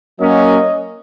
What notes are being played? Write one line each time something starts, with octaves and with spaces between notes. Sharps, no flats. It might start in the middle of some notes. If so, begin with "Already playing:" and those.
F#3 A#3 C#4 D#5